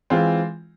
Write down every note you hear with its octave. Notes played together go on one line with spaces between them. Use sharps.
E3 G#3 C4 F4